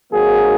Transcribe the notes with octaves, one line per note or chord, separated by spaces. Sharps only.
G#1 G#2 F#3 A#3 G#4